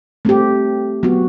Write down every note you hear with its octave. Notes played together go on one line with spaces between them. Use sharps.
A3 C4 G4
F#3 B3 F#4